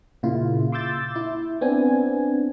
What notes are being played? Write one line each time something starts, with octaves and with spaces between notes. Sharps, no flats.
A#2 C#3 E4 F4
C6 D6 E6 G6 A6
E4
B3 C4 D4 G#5